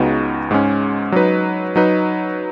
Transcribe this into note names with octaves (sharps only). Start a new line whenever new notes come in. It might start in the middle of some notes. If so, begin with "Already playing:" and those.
Already playing: C#2 C#3 B3 D#4 F#4
G#2 G#3 C#4
F#3 D#4 B4
F#3 D#4 B4